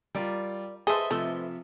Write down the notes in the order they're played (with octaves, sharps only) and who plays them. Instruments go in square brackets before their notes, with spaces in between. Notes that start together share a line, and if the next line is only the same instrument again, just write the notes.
[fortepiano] G3 F4 [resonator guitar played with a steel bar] A#4 D5
[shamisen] G#4 [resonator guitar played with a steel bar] A4 B4 C5 [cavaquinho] D#5 E5 [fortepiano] A5 C6
[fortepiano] C3 F3 E6 [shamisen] A3